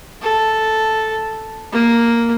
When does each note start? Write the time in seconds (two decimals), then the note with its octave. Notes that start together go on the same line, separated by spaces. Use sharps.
0.22 A4
1.72 A#3